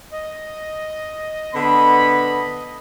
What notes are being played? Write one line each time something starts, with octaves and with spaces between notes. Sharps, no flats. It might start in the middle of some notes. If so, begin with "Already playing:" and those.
D#5
D3 B3 B5